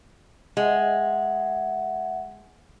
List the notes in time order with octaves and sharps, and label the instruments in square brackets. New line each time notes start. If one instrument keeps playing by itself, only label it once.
[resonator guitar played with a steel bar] G#3 [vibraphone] E5 F#5